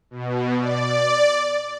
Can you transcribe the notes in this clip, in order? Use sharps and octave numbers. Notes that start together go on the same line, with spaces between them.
B2
D5